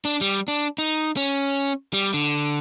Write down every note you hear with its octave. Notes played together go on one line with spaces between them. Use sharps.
D4
G3
D4
D#4
C#4
G3
D3